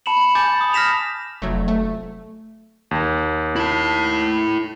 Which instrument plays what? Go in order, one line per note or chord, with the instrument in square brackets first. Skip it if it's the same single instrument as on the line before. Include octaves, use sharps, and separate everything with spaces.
[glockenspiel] A5 B5 C#7 E7 F#7
G#5 D6 G6 A6
D#6
F6 A#6 B6 E7 F7
[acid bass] F1 [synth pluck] F#3 A3
[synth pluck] A3
[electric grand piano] D#2
[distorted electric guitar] E4 A5